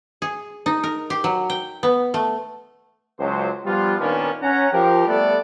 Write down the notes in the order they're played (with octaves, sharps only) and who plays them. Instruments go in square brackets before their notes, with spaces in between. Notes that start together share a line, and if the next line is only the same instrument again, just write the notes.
[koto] G#4
D#4
A#4
G4
F#3
G5
B3
A3
[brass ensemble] C#2 F#3 C5
F3 G3 B3 F4
A#2 D#3 A#3 B3 C#4 D4
C#4 F#5 A#5
F3 G4 A#4
G3 A3 B3 A4 D5